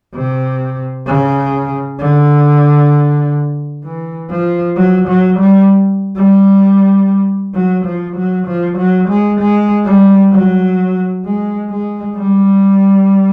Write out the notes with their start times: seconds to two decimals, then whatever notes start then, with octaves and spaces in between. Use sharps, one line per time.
0.15 C3
1.07 C#3
1.99 D3
3.84 E3
4.30 F3
4.77 F#3
5.08 F#3
5.39 G3
6.16 G3
7.54 F#3
7.85 F3
8.16 F#3
8.47 F3
8.78 F#3
9.09 G#3
9.40 G#3
9.85 G3
10.32 F#3
11.25 G#3
11.71 G#3
12.17 G3